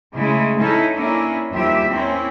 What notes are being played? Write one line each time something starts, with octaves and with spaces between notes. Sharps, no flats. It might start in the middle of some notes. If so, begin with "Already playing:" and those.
C#3 G#3 A3 E4
C#4 D#4 E4 A4
A#3 C#4 D4 E4
D#2 F3 G3 E4 G4 E5
A#3 C4 C#4 E4